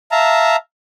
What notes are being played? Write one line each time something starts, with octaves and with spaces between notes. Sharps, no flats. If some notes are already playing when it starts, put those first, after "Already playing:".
E5 F5 A5 A#5